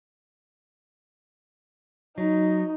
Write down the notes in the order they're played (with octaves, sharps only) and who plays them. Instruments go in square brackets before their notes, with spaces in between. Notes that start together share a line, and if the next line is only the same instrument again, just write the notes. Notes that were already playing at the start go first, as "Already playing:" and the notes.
[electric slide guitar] F#3 [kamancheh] D#4